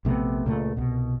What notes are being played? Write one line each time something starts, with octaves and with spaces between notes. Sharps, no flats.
A#1 C3 A3 B3
C#2 A#2 A3
C2 B2